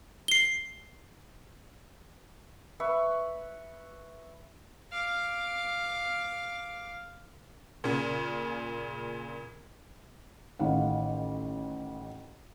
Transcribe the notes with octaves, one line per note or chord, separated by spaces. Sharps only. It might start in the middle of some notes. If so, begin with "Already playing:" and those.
C7 G7
B4 E5 B5 C#6
F5 D6
A#2 C#3
A1 D#3 F5 F#5